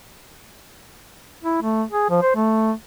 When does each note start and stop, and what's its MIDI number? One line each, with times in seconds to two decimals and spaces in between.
1.43 1.58 64
1.62 1.83 57
1.91 2.07 68
2.10 2.19 53
2.22 2.32 72
2.35 2.72 57